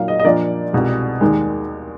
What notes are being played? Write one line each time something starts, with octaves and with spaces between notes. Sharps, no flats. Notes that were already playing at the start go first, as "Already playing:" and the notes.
Already playing: A#2 F#3 A#3 D#4 F5
D#5
D#5
A#2 F3 A#3 D4 D5
C2 B2 G#3
D#2 D#3 G#3